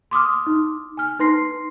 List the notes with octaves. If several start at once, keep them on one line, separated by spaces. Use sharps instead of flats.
C6 D6 D#6 F6
D#4
G#5 F6
D#4 B4 C6 A#6 C7